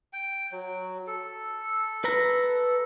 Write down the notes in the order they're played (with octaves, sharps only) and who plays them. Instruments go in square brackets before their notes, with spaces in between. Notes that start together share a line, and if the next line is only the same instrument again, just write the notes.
[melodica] G5
F#3
A4
[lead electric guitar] B4 A#5